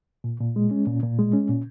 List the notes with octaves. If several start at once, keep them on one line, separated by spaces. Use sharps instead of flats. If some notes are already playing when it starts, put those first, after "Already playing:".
A#2
A#2
G#3
C#4
A#2
A#2
G#3
C#4
A#2